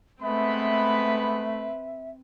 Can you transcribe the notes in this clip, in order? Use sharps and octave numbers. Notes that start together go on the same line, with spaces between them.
G#3 A3 B3 C4 B4 E5 B5